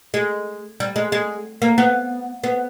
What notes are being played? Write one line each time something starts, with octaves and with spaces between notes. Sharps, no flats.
G#3
G3
G#3
G#3
A#3
B3
B3